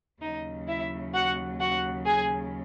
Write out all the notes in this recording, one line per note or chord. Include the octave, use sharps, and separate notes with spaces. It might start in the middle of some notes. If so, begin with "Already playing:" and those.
D#2 C#3 F#3 D#4 D#5
E4 E5
F#4 F#5
F#4 F#5
G#4 G#5